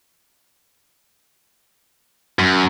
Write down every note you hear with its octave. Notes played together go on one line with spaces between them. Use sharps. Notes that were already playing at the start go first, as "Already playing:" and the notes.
F#2